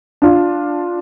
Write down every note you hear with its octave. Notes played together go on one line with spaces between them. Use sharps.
D4 F4